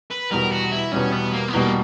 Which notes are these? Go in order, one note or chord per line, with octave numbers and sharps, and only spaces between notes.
B4
E2 B2 G3 A#4
F#4
E4
E2 B2 G3 C#4
B3
A#3
B3
E2 B2 G3 A#3